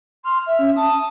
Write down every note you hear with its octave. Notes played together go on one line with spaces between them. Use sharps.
C6 F6
E5
C#4
A5 D#6